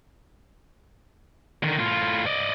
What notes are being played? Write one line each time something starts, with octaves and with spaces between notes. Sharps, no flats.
D3 D#3
A2 F4
D5 D#5